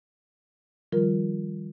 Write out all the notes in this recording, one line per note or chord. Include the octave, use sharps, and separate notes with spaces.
D#3 F3 G3 F4 A#4